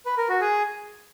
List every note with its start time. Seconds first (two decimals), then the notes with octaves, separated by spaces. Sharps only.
0.06 B4
0.17 A#4
0.29 F#4
0.41 G#4